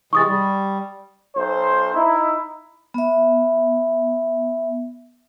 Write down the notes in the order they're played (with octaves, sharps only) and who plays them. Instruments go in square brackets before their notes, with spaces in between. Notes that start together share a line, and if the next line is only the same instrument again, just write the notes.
[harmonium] C3 E3 G#3 [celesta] C#6 D#6 A6
[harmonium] G3
[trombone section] B1 C5
D#4 E4
[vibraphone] B3 E5